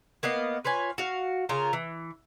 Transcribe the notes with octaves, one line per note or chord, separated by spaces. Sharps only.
A#3 B3 D#5 F5
F4 B4 C#5 G#5
F#4 F5
C#3 F4 A#4 A#5
E3